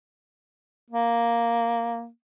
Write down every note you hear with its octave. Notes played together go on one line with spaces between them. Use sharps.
A#3